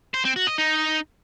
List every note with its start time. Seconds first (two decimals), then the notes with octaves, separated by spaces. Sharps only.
0.14 C5
0.25 C4
0.36 F#4
0.47 D#5
0.58 D#4